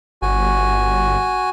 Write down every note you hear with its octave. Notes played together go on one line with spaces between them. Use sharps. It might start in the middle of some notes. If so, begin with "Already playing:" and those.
G1 F#4 G#5